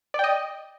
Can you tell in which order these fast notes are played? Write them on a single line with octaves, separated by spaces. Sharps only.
D5 G5 D#5